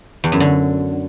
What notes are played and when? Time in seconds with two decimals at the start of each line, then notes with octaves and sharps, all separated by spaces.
0.24 E2
0.32 F#2
0.40 D3